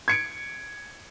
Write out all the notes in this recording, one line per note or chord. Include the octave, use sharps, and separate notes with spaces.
G#6 C#7 D7